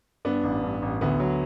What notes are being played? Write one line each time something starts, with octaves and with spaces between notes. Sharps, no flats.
G2 B3 D4
A1
G2
A1
D2 B3
F#3